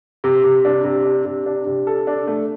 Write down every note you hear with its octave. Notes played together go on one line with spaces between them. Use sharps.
C3
C3
D4
C3
D4
C3
D4
C3
A4
D4
A3